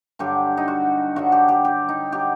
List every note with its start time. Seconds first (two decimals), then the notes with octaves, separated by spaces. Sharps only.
0.19 G2 D3 F#3 G4
0.57 D#4
0.68 F#4
1.16 G2 D3 F#3 F#4
1.32 G4
1.48 G4
1.65 G4
1.89 D#4
2.12 F#3 G4